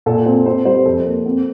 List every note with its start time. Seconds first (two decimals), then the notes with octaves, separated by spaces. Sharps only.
0.06 A#2 A4
0.26 C4
0.46 C4 C5
0.65 G3 C5
0.86 F2 A4
1.05 A#3
1.26 C4